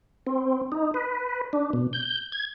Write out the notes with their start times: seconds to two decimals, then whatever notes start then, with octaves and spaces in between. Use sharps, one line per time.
0.27 C4
0.72 D#4
0.94 B4
1.53 D4
1.73 B2
1.93 G6
2.32 G#6